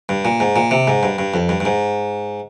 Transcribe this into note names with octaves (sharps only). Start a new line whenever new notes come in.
G2
A#2
G#2
A#2
C3
G#2
G2
G2
F2
G2
G2
G#2